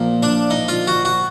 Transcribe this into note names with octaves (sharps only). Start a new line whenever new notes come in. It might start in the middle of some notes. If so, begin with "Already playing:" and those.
Already playing: A#2 F3 A#3
D4
D#4
F4
F#4
F#4